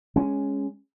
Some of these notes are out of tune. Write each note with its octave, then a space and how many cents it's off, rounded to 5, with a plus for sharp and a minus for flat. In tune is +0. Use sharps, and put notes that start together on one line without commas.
G#3 -5 C#4 +0